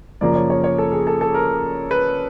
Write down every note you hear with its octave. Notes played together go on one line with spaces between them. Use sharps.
F#2 C#3 F3 A#3 D5
C#5
C#5
C#5
A4
G#4
A4
A4
A#4
B4